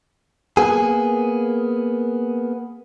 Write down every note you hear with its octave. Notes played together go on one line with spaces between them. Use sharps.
A#3 B3 G#4